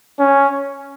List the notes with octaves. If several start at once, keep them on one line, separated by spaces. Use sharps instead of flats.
C#4